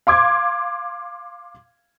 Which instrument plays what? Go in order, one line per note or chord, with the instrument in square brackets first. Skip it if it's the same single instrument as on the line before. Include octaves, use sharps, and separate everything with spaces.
[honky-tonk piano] F5 C6 D6 G#6